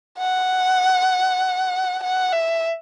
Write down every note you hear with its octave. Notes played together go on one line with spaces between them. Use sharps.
F#5
F#5
E5